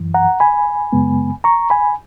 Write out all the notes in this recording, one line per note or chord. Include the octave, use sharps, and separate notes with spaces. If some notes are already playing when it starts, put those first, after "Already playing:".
Already playing: F#2 E3
F#5 A#5
G#5 B5
F#2 C#3 G#3 B3
A#5 C#6
G#5 B5